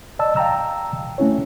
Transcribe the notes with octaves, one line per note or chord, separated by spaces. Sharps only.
D5 D#5 A5 E6
F5 G5 A5 A#5 E6
A3 C#4 E4 C#5